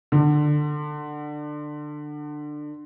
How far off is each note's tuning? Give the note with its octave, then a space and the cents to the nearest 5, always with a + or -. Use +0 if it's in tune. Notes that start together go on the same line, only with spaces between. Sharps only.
D3 +20